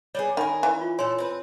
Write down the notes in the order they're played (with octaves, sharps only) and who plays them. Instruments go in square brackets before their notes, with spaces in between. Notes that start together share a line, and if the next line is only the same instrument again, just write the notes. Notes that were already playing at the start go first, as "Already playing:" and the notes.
[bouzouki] G3 B3 G#4 [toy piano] C#5
[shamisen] D#3 [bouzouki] A#4 G#5 [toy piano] B5
[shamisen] E3
[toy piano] F4
[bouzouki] A#2 A4 [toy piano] C#5 G#5 C6
[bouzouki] C4 B4